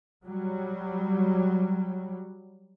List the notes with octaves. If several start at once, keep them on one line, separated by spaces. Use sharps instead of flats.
F#3 G3